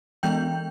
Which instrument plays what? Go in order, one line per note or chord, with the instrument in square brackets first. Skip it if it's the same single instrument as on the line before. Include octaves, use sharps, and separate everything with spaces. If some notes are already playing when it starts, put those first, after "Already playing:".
[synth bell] E3 G#3 B3 G5 G6